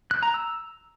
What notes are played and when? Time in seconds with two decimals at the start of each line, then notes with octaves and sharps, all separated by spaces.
0.11 F#6
0.23 A#5
0.34 E6